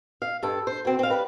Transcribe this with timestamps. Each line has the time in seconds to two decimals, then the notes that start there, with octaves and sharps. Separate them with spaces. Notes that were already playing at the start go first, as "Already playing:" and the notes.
0.22 F5
0.43 G2 A4
0.67 C5
0.85 B2 C4
0.99 C4 F5
1.10 G3 B4